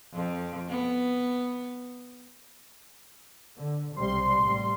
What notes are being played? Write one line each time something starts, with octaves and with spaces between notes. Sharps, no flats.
F2
B3
D3
B1 C3 G3 C6
A1 G3